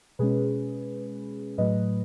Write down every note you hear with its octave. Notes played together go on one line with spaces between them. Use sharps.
B2 G#3 C#4 G#4 B4
A2 F#3 A3 B4 D#5